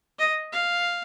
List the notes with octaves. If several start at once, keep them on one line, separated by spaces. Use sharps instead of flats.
D#5
F5